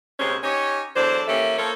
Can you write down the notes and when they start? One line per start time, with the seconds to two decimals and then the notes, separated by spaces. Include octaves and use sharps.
0.19 D2 C3 G#3 A#3 C5 C#5
0.42 C#4 D#4 G4 C#5
0.96 E2 F#3 D4 A4 C5
1.28 E3 A#3 C#4 G4 A4 E5
1.57 F3 A#3 A4 C#5